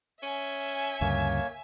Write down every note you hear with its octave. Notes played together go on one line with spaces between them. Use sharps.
C#4 E5 G#5
D2 G2 C#3 A#3 C#5